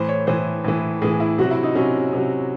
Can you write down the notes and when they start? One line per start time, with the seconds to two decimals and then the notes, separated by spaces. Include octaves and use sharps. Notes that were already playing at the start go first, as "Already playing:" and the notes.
Already playing: A2 E3 C5
0.09 C#5
0.27 A2 E3 C5
0.64 A2 E3
1.02 A2 E3 G#4
1.20 E4
1.38 C3 F#3 F#4
1.51 E4
1.63 D#4
1.75 C3 F#3 C#4
2.13 C3 F#3